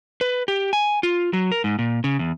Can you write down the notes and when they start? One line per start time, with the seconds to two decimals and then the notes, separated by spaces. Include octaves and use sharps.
0.21 B4
0.48 G4
0.73 G#5
1.03 F4
1.33 F#3
1.52 A#4
1.64 G#2
1.79 A#2
2.04 C#3
2.19 E2